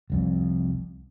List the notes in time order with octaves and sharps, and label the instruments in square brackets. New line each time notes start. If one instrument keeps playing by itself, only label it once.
[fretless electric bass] F1 C2 F2